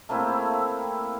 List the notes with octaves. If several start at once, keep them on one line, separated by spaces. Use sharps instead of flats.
A3 A#3 C4 E4